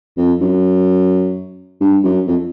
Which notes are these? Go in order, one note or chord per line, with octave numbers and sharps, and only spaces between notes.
F2
F#2
G2
F#2
F2